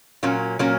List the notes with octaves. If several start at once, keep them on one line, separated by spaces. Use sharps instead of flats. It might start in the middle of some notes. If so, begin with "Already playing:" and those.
A#2 F#3 A#3 C#4
A#2 F#3 A#3 C#4